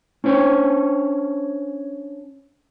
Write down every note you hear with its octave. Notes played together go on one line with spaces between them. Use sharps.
C#4 D4 C5 C#5